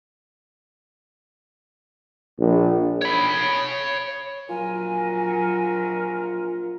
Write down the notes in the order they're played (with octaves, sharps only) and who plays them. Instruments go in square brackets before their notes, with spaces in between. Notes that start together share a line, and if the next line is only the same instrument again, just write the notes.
[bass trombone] A#1
[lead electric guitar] C#5 B5
[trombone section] A#1 A#2 A#4 [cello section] F#3 [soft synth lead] F4 [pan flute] G#5